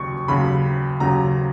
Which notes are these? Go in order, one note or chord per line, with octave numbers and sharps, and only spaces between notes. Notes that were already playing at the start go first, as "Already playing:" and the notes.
Already playing: D#2 C#3 F#3 C#6
D#2 C#3 F#3 B5
D#2 C#3 F#3 A#5